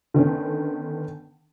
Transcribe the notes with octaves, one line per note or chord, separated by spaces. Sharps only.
D3 D#3 B3 C#4